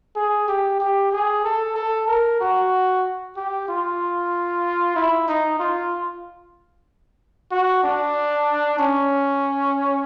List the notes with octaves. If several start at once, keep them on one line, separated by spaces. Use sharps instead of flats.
G#4
G4
G4
G#4
A4
A4
A#4
F#4
G4
F4
E4
D#4
F4
F#4
D4
C#4